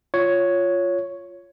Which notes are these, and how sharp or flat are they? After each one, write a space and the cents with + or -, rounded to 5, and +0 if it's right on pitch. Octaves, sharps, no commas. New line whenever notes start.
F4 +0 C#5 +5